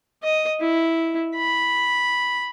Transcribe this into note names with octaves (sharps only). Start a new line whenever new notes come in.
D#5
E4
B5